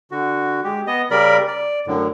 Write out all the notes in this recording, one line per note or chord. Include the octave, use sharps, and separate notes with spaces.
D3 F#4
G#3 G4
B3 D#5
C#3 G3 A#4 D5 B5
D5
F#2 A2 D3